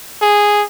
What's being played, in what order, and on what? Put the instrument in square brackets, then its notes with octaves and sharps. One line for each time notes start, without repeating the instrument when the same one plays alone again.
[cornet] G#4